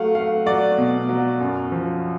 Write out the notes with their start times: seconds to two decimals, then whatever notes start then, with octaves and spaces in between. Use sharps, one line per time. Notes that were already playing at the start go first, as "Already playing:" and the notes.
Already playing: F#3 A3 F5 F#5
0.15 A3 F5
0.46 F#3 D5
0.78 B2
1.09 F#3
1.41 F#2
1.72 F3